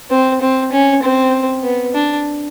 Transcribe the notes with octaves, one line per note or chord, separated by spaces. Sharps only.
C4
C4
C#4
C4
B3
D4